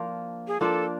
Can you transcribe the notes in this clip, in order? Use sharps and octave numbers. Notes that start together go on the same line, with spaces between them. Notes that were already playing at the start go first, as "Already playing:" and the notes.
Already playing: F3 A#3 D4 F4
G#4
F3 A#3 D4 F4 A4